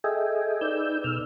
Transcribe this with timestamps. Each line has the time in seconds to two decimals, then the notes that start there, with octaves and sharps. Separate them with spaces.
0.04 G#4 A4 D#5 E5 G5 G#5
0.61 D#4 B4 D5 E6 G6
1.04 B2 E6 F6